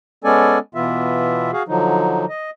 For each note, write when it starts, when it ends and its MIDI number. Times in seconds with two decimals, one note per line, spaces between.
0.24 0.58 56
0.24 0.58 59
0.24 0.58 61
0.24 0.58 69
0.24 0.58 74
0.24 0.58 80
0.75 1.51 47
0.75 1.51 52
0.75 1.51 59
0.75 1.51 65
0.75 1.51 76
1.53 1.63 66
1.53 1.63 68
1.53 1.63 77
1.68 2.25 50
1.68 2.25 53
1.68 2.25 54
1.68 2.25 63
2.29 2.50 75